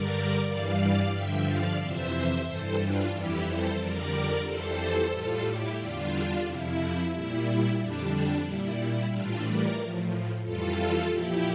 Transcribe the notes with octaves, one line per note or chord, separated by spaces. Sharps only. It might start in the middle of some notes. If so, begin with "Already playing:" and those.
Already playing: G2 D3 G3 A#4 D5
G2 E3 G3 D5 F5
G2 D3 F3 E5 G5
D5 F5
F2 C3 E3 C5 E5
G2 E3 G3 A4 C5
D4 F4
F2 E3 G3 E4 G4
A4 C5
F2 D3 G3 A#4 D5
F2 E3 G3 A4 C5
A2 G3 F4 A4
E4 G4
E2 D3 G3 D4 F4
F2 C3 F3 E4
A#2 G3 E4
F2 D3 G3 D4
A#2 G3 E4
E4
A2 E3 G3 D4 F4
A#4 D5
A2 F3
F2 E3 G3 F4 A4
A#2 F3 E4 G4